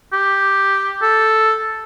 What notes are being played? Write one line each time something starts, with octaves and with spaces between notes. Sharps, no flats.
G4
A4